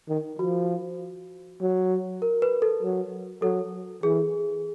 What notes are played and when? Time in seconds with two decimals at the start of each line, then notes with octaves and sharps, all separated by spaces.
0.09 D#3
0.39 F3 F#4
1.61 F#3
2.22 A#4
2.42 B4
2.62 A4
2.83 F#3
3.42 F#3 A4
4.03 E3 G#4